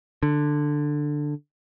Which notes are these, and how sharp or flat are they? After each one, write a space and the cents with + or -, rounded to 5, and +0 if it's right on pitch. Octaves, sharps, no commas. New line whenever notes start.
D3 +10